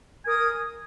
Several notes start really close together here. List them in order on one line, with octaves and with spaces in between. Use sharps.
G#5 A#4 D#6